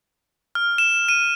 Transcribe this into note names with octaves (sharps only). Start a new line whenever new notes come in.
F6
E7
D#7